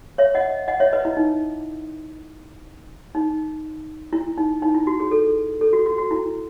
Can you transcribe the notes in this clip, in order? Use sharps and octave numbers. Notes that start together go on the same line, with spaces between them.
C#5 E5
D#5 F#5
D#5 F#5
C#5 E5
B4 D#5
E4
D#4
D#4
E4
D#4
D#4
E4
F#4
G#4
A4
A4
F#4
F#4
F#4
E4